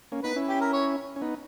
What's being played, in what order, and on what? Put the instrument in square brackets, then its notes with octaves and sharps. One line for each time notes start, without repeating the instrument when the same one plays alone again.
[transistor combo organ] A#3 C#4
[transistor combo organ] B3 D#4 [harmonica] B4
[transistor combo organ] C#4 E4
[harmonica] G4
A#4
C#5
[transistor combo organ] C#4
B3 D#4